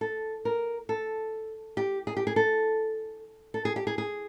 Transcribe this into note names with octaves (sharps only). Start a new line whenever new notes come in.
A4
A#4
A4
G4
G#4
G4
G#4
A4
A4
G#4
G4
G#4
G#4